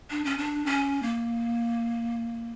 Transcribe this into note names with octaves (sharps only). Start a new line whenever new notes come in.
D4
C#4
D4
C#4
A#3